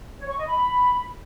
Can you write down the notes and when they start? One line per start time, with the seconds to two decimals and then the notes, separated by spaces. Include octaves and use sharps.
0.19 C#5
0.28 C#6
0.38 D#5
0.47 B5